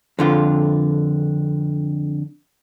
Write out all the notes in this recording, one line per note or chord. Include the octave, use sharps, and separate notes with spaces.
F2 D3 F4